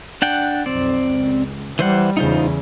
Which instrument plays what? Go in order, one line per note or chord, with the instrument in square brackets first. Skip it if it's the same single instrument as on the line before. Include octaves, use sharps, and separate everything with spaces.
[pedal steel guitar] D4 F#5 G5
[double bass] B1 F2 [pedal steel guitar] C4 D5
[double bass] C#2
[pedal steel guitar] E3 C5 F#5 [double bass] G3
[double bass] E2 C#3 [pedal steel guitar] D#4 F4 C5